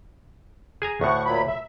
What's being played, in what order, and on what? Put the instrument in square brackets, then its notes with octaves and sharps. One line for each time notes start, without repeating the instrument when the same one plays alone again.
[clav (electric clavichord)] G#4 G#5 A#5
[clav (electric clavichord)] D2 A2 [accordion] F#5 C#6
[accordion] A#2 F#3 B5
E5